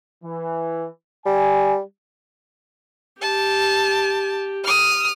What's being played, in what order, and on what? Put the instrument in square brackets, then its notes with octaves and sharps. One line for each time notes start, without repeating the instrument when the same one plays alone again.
[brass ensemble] E3
[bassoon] G3 [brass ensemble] G#5
[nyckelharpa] G4 [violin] A5
[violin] D#6 F6